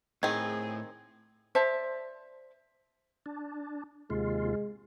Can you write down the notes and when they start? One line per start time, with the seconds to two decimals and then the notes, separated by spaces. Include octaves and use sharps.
0.23 A2 D#3 C4 G#4 G#6
1.55 C5 D5 E5 A5
3.26 D4
4.10 D#2 C3 G#3 F4